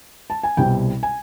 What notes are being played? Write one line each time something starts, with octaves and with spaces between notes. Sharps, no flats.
A5
G#5
C2 B2 G3 C4 G5
G#5